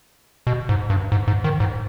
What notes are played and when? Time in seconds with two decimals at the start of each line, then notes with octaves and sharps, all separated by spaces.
0.47 B2
0.69 G#2
0.90 G2
1.12 G#2
1.28 G#2
1.44 D#3
1.60 G#2